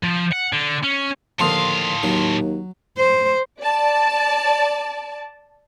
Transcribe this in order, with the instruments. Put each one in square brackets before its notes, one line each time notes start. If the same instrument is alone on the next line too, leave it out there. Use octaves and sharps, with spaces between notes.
[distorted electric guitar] F3
F#5
D3
C#4
[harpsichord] D#2 D3 F3 [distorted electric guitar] A2 F5 [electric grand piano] A5 C6 D#6
[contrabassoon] D#2 [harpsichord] F#3
[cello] C5
[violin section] D5 A5